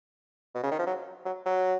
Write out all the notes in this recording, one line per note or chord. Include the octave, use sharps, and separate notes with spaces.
B2
C#3
D#3
F3
F#3
F#3
F#3